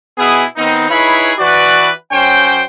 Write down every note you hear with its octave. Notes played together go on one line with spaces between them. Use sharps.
B2 B3 E4 G#4
D#3 B3 C4 D#4
D#4 E4 G#4 B4 C#5 B5
E3 F#4 B4 D5
F#2 C#4 C5 G5